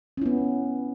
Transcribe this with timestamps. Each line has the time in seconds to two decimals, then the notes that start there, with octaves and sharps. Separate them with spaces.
0.17 C#4
0.22 E4
0.26 B3